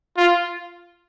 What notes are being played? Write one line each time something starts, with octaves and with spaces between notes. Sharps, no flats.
F4